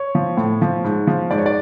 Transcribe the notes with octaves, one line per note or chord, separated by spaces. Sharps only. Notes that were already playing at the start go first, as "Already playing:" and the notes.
Already playing: C#5
F3
A2
F3
G#2
F3
G#2 D5
C#5
D5